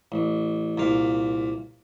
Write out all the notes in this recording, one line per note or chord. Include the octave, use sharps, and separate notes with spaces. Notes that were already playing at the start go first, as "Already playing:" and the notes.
A1
C2 A#2 F5